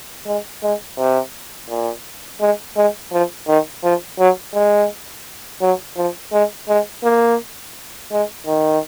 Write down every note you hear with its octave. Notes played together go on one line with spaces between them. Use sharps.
G#3
G#3
C3
A#2
G#3
G#3
F3
D#3
F3
F#3
G#3
F#3
F3
G#3
G#3
A#3
G#3
D#3